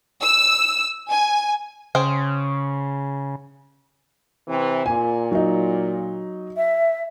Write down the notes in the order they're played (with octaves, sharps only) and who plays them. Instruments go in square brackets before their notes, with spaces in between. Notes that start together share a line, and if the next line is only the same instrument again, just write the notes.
[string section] E6
G#5
[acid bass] C#3 [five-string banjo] G#4 C5 G5
[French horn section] C3 E3 C4
[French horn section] A#2 [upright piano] G#5
[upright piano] F#3 D#4
[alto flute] E5